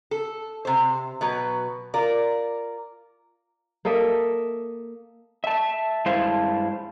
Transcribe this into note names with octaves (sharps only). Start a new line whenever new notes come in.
A4
C3 C5
B2 F#3 B4
F4 A#4 D5
A#3 A4 D#5 E5
E5 A5
G2 G#3 E4 C5 F5 A5